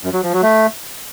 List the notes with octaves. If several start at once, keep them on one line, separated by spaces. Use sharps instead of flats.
F#2
F#3
F3
F#3
A3